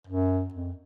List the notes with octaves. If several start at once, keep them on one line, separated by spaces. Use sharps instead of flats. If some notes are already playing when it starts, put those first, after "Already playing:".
F#2
F2